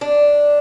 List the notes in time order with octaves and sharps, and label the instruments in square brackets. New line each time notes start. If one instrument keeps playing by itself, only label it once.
[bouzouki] D4